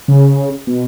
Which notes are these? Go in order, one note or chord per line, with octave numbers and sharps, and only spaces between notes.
C#3
B2